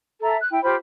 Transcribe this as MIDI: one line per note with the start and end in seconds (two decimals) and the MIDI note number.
0.22 0.36 69
0.22 0.36 76
0.22 0.36 82
0.39 0.48 90
0.51 0.62 64
0.51 0.62 79
0.63 0.75 65
0.63 0.75 67
0.63 0.75 72
0.63 0.75 83